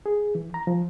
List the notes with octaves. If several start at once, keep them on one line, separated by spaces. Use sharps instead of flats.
G#4
E3
A#5
F3